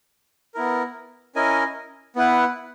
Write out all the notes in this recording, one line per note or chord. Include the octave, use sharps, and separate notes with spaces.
B3 E4 A#4
C#4 E4 A#4 D#5 G#5
B3 E4 B4 F#5